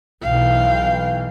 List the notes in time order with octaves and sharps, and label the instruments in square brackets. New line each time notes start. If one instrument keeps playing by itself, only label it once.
[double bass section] B1 E3 [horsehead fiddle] F5 G5